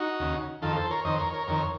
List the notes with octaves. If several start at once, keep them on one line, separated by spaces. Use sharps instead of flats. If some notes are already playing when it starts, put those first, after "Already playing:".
Already playing: D#4 F#4
D#2 C#3
F2 D#3 F4 A4
A4 C5
A#4 C#5
F2 D#3 C5 D#5
A#4 C#5
A#4 C#5
F2 D#3 A#4 C#5